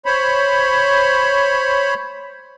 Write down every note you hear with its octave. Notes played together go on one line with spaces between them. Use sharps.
C5 C#5 B5